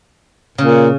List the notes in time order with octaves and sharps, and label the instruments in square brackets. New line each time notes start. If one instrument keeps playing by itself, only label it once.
[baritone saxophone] A#2 [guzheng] C#3